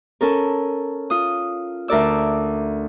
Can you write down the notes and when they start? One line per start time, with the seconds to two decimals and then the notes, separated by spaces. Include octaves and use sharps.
0.21 C#4 A4 A#4
1.10 F4 D#6
1.88 D2 A#4 D5 E6